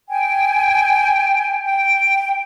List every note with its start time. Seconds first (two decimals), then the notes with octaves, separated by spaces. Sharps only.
0.08 G5 G#5
1.63 G5